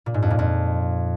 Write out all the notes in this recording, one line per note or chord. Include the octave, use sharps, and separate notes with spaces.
A#2
G#2
F2
A#2
F2